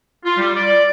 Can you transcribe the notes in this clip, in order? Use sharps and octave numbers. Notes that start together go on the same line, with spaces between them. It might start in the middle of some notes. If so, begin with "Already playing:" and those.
F4
G3
D5